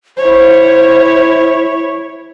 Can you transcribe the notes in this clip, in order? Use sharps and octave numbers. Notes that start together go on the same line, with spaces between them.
E4 C5 C#5